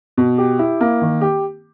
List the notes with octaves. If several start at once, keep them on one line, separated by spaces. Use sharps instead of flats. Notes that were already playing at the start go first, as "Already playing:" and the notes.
B2
G4
E4
A#3
D#3
G4